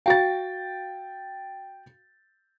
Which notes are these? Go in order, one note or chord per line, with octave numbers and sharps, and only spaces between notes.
F#4 F5 G5 A6